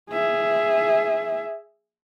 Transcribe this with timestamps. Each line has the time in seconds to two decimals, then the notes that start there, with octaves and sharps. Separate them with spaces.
0.10 G#4 E5